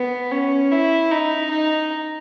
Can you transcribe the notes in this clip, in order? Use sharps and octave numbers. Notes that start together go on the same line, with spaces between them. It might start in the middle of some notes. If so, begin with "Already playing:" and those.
Already playing: B3
C#4
E4
D#4
D#4